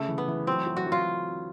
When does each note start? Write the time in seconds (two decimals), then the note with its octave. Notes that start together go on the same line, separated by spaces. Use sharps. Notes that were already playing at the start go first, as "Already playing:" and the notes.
Already playing: C#3 A3
0.09 E3
0.18 B3
0.28 E3
0.47 F#3 C4
0.67 F#3
0.77 F#4
0.86 F#3
0.92 F4